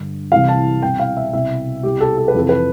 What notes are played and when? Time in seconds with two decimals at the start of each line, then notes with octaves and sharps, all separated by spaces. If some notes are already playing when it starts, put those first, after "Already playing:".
Already playing: G2 D3
0.32 C2 C3 E3 F5
0.48 A5
0.82 C2 B2 G5
0.99 F5
1.17 E5
1.33 C2 B2 E5
1.83 C2 B2 G4
2.00 A4
2.18 A4
2.28 B4
2.35 F2 C3 E3 A4
2.49 B4